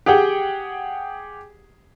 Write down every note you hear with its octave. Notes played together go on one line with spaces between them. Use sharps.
G4 G#4 F#5 G5